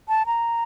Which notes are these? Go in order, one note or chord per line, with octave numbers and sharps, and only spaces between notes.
A5
A#5